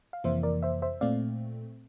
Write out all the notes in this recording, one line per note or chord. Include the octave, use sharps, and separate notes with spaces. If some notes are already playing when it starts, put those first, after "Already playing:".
F5
F2 C3 E3 A#3 C5 E5
A#4 D5
C5 E5
C5 E5
A#2 A3 C4 D5 F5